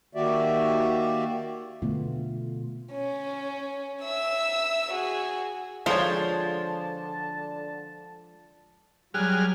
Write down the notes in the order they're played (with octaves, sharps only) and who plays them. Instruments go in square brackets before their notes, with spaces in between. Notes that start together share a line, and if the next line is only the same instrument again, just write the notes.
[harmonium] D#3 A#3 F#4 G4 D5 E5
[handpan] B2 D3 A3 B3 F4
[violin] C#4
E5 E6
F#4 G#4
[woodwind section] D3 A5 [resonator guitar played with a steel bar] F3 G#3 C5 [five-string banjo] F4 C#5
[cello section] F#3 [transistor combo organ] G3 G#4 F6 [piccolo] F#6